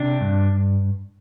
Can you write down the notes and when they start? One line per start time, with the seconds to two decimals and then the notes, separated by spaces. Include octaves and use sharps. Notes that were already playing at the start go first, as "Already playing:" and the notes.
Already playing: C3 D4
0.21 G2